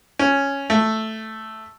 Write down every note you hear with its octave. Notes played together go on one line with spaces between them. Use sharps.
C#4
A3